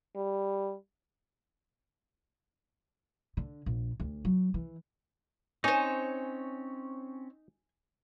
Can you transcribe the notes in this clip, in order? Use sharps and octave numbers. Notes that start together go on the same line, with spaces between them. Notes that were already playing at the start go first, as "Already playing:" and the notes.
G3
D3
A#1
D2
F#3
E3
C4 C#4 D#4 C5 C#5 G#5